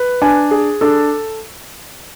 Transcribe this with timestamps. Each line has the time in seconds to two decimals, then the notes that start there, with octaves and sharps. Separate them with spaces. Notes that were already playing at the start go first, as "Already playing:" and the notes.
Already playing: B4
0.22 D4 G#5
0.51 G#4
0.81 D4 A4